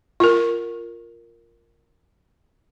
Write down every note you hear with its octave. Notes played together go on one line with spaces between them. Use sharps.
F4 A#4